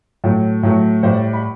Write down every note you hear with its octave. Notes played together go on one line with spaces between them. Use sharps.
A2 F#3 A3
A2 F#3 A3
A2 G3 C5
D5
B5